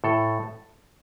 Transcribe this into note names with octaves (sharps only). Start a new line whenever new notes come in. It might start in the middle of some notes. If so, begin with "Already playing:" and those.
A2 A4